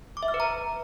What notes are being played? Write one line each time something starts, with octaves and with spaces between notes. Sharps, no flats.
D6
E5
F6
B4
A#5